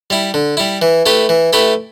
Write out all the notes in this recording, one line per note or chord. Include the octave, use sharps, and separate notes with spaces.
G3 E4
D3
G3 E4
E3
A3 E4 G4 B4
E3
A3 E4 G4 B4